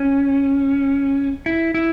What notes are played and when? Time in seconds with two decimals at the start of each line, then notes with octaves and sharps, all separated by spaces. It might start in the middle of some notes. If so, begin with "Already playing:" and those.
Already playing: C#4
1.46 E4
1.74 E4